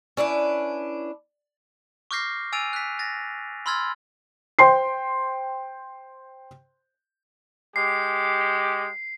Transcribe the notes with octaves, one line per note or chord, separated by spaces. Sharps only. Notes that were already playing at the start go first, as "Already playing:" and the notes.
C#4 D4 E4 B4
C#6 D6 F6 G6 A#6 C7
G#5 E6 A6 D7 D#7 F7
F#6 B6
A6 A#6
B5 C6 E6 F6 G#6 A6
C5 G5 C6 C7
G#3 G4 C7